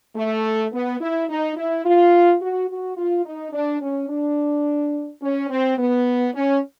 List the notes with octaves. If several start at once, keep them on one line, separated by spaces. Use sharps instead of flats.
A3
B3
E4
D#4
E4
F4
F#4
F#4
F4
D#4
D4
C#4
D4
C#4
C4
B3
C#4